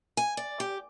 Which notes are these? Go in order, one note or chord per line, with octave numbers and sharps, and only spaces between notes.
G#5
D5
G4